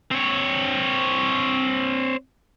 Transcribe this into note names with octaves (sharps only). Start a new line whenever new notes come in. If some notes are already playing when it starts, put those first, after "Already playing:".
C4 C#5